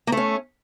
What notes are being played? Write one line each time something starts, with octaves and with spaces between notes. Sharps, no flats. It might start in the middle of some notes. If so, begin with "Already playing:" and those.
A3 A#3 C#4